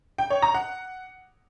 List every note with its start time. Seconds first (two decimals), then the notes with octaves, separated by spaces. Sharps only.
0.18 G5
0.30 C#5
0.42 A#5
0.54 F#5